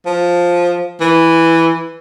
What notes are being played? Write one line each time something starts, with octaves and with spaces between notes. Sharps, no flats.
F3
E3